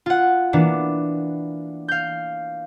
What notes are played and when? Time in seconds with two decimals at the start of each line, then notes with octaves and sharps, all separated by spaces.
0.06 F4 F#5
0.53 E3 A#3 B3 D4
1.88 F5 G6